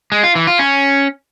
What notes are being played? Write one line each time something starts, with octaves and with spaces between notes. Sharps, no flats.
G#3
F4
E3
F4
C#4